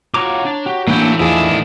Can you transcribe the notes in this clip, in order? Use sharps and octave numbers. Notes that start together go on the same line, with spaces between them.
F4 F#4 C#5 A#5 D6
D4 A5
F#4 G4
A2 E3 F#3 A#3 D4 E4 G5
E2 D#3 F3 D4 E4 G#4